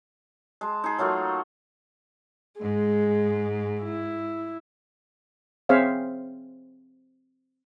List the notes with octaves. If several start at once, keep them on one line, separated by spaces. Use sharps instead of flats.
G#3 A5
D#4 G#4
F#3 A3 A#3 F4
G#2 G#3
E4
C4 G#4 C5 C#5 E5 F5